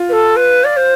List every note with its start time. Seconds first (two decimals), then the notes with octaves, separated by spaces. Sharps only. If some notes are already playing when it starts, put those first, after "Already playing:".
Already playing: F4
0.09 B4
0.12 A4
0.36 B4
0.64 D5
0.77 C5